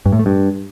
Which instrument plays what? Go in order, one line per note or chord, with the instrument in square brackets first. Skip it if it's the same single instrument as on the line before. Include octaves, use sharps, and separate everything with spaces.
[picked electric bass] G2
A2
A3
G2